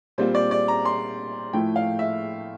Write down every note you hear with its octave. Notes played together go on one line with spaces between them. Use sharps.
A#2 G3 C4 F4 C5
D5
D5
A#5
C6
A2 F3 A3 E4 G5
F5
E5